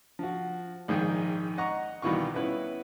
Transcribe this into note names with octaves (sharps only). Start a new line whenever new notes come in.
F3 F#4
A#1 G#2 D#3 G#4 G5
D#5 F#5 A#5 C#6
C2 B2 D#3 E3 F4 C#6
B3 C#4 E4 B4